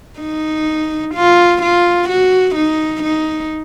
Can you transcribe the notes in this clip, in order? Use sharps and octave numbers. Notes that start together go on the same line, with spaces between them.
D#4
F4
F4
F#4
D#4
D#4